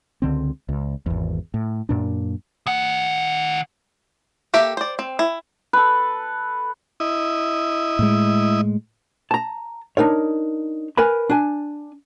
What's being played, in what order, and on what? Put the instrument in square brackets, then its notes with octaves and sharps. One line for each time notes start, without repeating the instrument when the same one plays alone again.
[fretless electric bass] C#2 D3 C4
C#2
G#1 E2
A2
F#2 A#2 D4
[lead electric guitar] D#3 F#5
[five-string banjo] A#3 G4 A4 E5
C5 D5
C4
E4
[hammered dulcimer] A4 B4
[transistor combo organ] E4 D#5
[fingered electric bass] A2 G#3
[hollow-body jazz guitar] A5 A#5
D4 D#4 A#4 C#5
A#4 B4 G#5 B5
D4 G#5